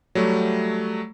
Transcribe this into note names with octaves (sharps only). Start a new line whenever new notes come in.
F#3 G3 A3